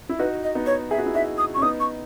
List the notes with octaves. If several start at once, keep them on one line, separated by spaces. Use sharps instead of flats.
E4
D#4 F#4 B4
D#5
B3 D#4
C#5
G#4 E5
F#4
E4
D#4 F#4 E5
D#6
C#4 C#6
B3 D#4 D#6
C#6